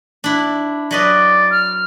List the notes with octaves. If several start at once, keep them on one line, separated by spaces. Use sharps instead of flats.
D4 E4
F#3 B4 D5 D#5
F6